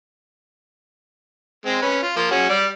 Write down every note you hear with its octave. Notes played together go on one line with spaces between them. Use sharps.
G#3 C4
C#4 B4
F4
F3 A#3 F4
C#4 F#4 G#4
G3 D5